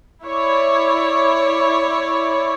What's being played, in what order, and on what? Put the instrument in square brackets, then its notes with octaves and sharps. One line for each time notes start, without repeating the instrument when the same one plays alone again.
[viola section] E4 C#5 D5